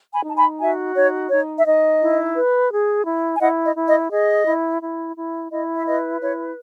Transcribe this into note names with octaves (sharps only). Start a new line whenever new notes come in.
G#5 B5
D#4 A5
G#5 B5
F#4 E5 G#5
D#4 C#5
D#4 C#5
E5
D#4 D#5
E4
B4
G#4
E4
G#5
E4 D#5 F#5
D#5
E4
D#5
G#4 D#5
E4
E4
E4
E4 D#5
E5
B4 D#5
E4 C#5